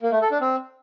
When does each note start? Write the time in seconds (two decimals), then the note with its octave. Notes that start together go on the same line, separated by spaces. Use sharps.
0.02 A#3
0.12 A3
0.22 A4
0.31 D4
0.41 C4